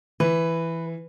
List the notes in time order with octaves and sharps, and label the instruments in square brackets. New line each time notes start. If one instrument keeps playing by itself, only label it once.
[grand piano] E3 [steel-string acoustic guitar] B4